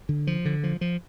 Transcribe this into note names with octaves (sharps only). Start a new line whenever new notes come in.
D3
F3
D3
F3
F3